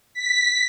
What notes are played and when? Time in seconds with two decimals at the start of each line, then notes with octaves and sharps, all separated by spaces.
0.14 B6